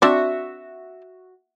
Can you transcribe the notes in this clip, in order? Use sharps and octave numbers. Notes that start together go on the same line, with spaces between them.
C4 D4 F#4 D5 E5